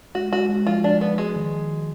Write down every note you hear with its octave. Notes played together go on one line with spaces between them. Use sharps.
G#3 F#4
G#3 F#4
G#3
F3 F4
F3 D4
F3 B3
G#3 F#4
D#3